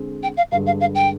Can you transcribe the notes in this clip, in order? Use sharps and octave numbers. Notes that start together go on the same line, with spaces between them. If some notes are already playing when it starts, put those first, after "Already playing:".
Already playing: D3 G#3 C4
G5
F5
G2 D3 G#3 F5
F5
F5
G5